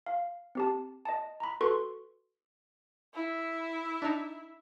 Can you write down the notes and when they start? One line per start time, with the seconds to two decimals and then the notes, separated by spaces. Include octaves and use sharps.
0.06 F5
0.55 C4 G4 A5
1.05 D#5 A5
1.40 A#5 B5
1.61 F#4 A4 B4 C6 C#6
3.14 E4 E5
4.02 D4 D#4